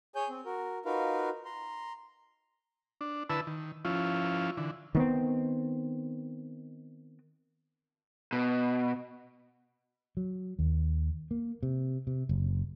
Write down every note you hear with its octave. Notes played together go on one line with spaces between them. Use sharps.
G#4 C#5 G#5 G6
C4
F#4 A#4
D#4 F4 F#4 A#4 B4 F5
A#5 C6
D4
D3 E4 B4 A5 E6
D#3
F3 C#4 E4 F4
D3 E3
D#3 B3 C4
B2
F#3
D#2
A#3
C3
C3
F#1